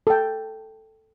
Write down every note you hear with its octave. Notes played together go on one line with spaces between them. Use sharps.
A4 G5